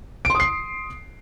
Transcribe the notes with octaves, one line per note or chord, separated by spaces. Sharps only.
C6 D#6 C7 D7